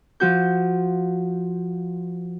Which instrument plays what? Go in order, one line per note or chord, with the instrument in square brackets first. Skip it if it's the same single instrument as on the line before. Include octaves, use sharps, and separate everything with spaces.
[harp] F3 F#4 G6